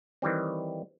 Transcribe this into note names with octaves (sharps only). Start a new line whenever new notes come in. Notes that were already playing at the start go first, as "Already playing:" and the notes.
D#3 E3 G3 C4